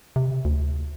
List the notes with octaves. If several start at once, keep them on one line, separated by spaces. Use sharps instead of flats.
C3
D2